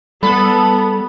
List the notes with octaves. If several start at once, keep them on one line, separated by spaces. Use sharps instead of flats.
G3 B3 A4 B5